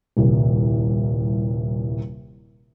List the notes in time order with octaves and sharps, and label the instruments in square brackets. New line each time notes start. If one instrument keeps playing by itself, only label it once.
[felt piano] D#1 C2